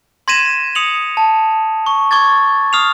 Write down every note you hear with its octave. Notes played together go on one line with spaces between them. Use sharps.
C6 G#6 A#6 B6 D#7 E7
D#6 C#7 F7 F#7
A5
C#6
C#6 D6 G#6 A6
D#6 F6 C7 F7